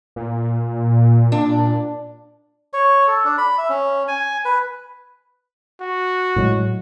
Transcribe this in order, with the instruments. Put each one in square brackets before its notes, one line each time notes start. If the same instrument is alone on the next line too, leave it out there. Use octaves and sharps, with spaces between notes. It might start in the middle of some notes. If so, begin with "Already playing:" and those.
[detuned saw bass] A#2
[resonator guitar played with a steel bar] D4
[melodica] C#5
A4
D4
B5
E5
C#4
G#5
B4
[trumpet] F#4
[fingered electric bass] A2 F#3 G#3